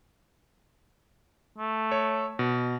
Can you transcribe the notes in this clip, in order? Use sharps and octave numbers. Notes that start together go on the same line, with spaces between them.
A3
C#5
B2